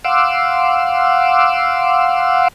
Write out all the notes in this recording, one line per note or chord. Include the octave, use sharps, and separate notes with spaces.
F5 F#5 C6 D6 E6